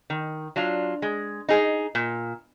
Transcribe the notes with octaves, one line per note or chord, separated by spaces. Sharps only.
D#3
F#3 D4 F4
G#3
D#4 G#4
A#2